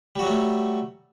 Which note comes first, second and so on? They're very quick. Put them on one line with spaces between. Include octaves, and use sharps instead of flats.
G3 F#4 F#3 A3